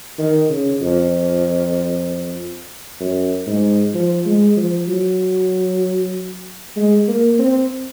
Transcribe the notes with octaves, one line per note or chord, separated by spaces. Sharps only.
D#3
C#3
F2
F#2
G#2
F3
G#3
F3
F#3
G#3
A#3
C4